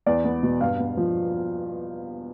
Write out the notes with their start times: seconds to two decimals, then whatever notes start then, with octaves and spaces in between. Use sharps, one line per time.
0.06 E2 D5
0.25 B3
0.43 B2
0.61 G2 F5
0.79 B3
0.97 F3